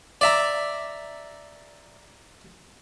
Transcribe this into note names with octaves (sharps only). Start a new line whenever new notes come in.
D5 E5 A#5